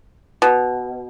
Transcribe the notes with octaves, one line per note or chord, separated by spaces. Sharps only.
B2